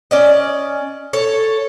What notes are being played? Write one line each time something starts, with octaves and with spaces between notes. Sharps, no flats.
C#4 D5 D#5
A4 C#5